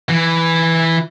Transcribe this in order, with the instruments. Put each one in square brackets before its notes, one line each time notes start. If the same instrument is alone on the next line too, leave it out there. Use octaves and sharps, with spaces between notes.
[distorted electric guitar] E3